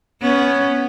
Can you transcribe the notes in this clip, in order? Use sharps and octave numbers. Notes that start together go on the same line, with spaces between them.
B3 C#4